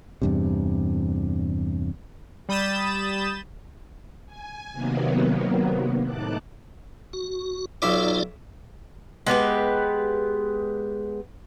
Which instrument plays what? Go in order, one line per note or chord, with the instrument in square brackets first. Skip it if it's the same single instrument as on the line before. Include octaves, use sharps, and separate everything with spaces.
[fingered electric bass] E2 G2 C3
[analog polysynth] G3 B5 D#6 G6 A6 E7
[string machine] G#5
C3 D#3 F#3 A#3 B3
A2 D#4 A5 D6 F#6
[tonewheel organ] F#4
[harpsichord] B1 E5 D6 [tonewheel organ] D#4 F4 D5
[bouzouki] G#3 B3 G4 B4